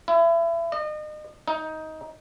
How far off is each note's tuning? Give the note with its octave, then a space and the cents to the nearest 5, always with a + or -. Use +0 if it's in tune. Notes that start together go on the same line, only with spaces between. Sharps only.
E4 +30
D#5 -35
D#4 +15